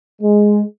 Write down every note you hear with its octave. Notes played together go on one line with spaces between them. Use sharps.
G#3